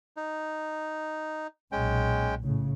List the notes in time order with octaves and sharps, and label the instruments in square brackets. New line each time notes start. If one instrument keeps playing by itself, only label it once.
[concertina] D#4
[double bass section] B1 A#2 [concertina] G#3 C#4 G5
[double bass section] A2 C#3